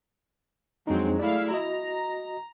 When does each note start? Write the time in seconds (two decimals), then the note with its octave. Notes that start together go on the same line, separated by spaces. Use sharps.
0.87 F2 F#3 G#3 C4 D4 D#4
1.19 A3 E4 G#4 D5 F5
1.51 F#4 D#5 A#5